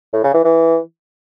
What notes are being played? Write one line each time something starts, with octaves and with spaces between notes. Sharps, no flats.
A2
C#3
E3
E3